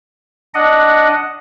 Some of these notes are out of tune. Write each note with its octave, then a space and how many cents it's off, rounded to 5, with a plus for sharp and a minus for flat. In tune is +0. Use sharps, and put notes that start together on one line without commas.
D4 +0 D#5 +0 F#5 +0